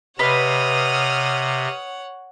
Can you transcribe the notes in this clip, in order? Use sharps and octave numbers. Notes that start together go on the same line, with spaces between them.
C3 B4 C#5 D#5 F#5 C6 D#6 F6